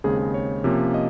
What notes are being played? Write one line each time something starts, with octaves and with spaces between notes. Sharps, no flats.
D#2 C#3 G#3 C4 G#4
G#4
C#5
C3 F3 A#3 C#4
D#5